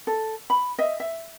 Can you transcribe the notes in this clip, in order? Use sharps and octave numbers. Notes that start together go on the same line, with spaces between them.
A4
B5
D#5 E5
E5